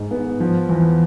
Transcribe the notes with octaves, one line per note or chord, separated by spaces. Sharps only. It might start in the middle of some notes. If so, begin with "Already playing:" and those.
Already playing: G#2 G#3
B3
F3
E2